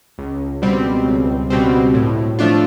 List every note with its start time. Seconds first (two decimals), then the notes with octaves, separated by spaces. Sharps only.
0.18 C#2
0.62 B2 G3 C4
1.06 C#2
1.50 B2 G3 C4
1.94 A2
2.39 F3 A3 D4 F4